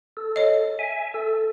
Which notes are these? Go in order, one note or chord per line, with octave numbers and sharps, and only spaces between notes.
A4
C#5 D#5
E5 G#5
A4